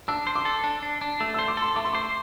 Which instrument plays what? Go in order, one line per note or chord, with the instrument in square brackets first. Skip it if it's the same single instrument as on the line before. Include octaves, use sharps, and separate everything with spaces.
[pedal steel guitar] D4 [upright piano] E6
[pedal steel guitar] C5
[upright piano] D6
[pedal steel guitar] A4
D4
D4
D4
[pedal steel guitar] A3 [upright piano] E6
[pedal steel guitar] C5 [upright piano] E6
[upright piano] D6
[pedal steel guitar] A4 [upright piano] C6
[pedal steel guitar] A3 [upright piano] D6
[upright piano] C6
[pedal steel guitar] C5 [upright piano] D6